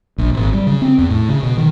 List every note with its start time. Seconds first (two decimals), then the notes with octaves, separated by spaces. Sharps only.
0.18 A#1
0.34 G#1
0.53 G3
0.67 C#3
0.82 C4
0.98 E2
1.10 A2
1.29 C#3
1.43 B2
1.57 D#3